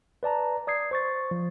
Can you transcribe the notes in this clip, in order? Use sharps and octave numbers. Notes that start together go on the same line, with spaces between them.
B4 D5 A5 A#5
D5 D#6 G#6 C7
C5 C#6 A6
F3